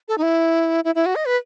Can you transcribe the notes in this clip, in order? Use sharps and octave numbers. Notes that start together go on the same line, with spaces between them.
A4
D#4
E4
E4
E4
F#4
D#5
B4